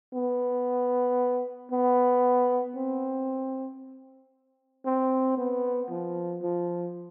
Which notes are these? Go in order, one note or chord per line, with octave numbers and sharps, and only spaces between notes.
B3
B3
C4
C4
B3
F3
F3